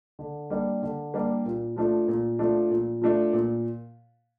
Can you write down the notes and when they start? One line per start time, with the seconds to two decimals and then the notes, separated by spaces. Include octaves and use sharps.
0.19 D3
0.50 G3 A#3 D4
0.82 D3
1.14 G3 A#3 D4
1.45 A#2
1.76 F3 A3 D4
2.08 A#2
2.39 F3 A3 D4
2.71 A#2
3.02 F3 A3 D4
3.33 A#2